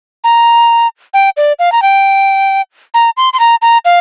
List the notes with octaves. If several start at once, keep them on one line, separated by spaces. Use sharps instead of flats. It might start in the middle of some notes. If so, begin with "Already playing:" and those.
A#5
G5
D5
F5
A#5
G5
A#5
C6
C6
A#5
A#5
F5